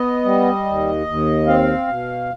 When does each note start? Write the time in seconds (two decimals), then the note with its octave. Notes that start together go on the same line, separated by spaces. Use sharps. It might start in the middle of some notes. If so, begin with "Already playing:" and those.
Already playing: B3 D#5
0.25 G3
0.65 D#2
1.07 D#2
1.47 C4 F5
1.87 B2